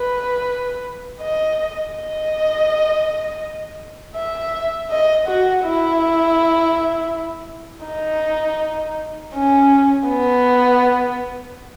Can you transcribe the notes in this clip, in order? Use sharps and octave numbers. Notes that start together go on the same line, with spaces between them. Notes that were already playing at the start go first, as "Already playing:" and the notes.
Already playing: B4
D#5
D#5
E5
D#5
F#4
E4
D#4
C#4
B3